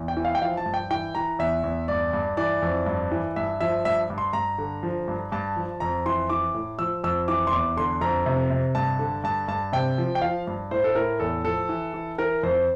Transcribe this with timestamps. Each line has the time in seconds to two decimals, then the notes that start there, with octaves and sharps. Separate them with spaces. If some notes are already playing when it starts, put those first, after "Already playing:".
Already playing: E2
0.08 G5
0.17 E3
0.25 F5
0.35 G5
0.42 F3 F5
0.57 A5
0.66 G2
0.74 G5
0.90 E3 G5
1.15 E3 A#5
1.39 E2 E5
1.64 E2
1.88 G2 D5
2.13 G2
2.37 E3 D5
2.62 F2
2.86 G2
3.12 E3
3.36 G2 E5
3.61 F3 E5
3.85 G2 E5
4.10 G2
4.18 C6
4.33 G2 A#5
4.58 D3
4.83 F3
5.08 G2
5.32 G2 A5
5.56 F3
5.80 F2 A#5
6.06 E3 C6
6.30 E3 D6
6.54 A2
6.79 F3 E6
7.04 F2 E6
7.28 E3 D6
7.47 C6
7.52 E2 D6
7.77 D3 C6
8.01 F2 A#5
8.26 C3
8.50 C3
8.75 G2 A5
8.99 D3
9.24 G2 A5
9.48 G2 A5
9.73 C3 G5
9.98 F3
10.15 G5
10.22 F3 F5
10.47 G2
10.71 A2 C5
10.84 A4
10.95 A2 A#4
11.20 E2 A4
11.44 F3 A4
11.69 E3
11.94 E3
12.18 E3 A#4
12.43 F2 C5